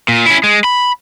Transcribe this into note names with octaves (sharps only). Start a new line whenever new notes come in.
A#2
C#4 E4
G#3
B5